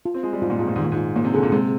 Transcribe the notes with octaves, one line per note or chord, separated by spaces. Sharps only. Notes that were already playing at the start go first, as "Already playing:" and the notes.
F4
C4
G#3 F4
G3
G#2 F4
A#2
G#2 F4
A#2
G#2 D#3
A#2
G#2
F4
A#2 A#3
C3
D3 G#4
A#2
C3 G#3